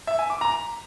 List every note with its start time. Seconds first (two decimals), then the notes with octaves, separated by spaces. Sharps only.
0.07 E5
0.19 G#5
0.30 D6
0.41 A#5